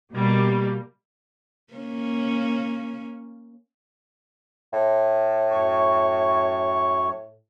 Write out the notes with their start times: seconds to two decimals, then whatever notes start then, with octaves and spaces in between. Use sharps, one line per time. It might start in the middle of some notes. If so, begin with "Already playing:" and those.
0.13 B2 G3 A#3
1.74 A#3 C#4
4.73 A2
5.51 F#2 C#5 C#6